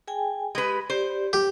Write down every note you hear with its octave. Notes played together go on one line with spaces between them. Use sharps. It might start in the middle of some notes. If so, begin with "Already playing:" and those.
G#4 G5 G#5
G#3 G4 B4
G4 C5 D5
G4